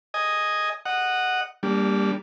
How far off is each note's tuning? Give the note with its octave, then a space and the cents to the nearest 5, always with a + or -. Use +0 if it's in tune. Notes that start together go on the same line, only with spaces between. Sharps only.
D#5 +0 G#5 +0
D#5 -15 F#5 +0
G3 +15 A#3 +0 D4 -25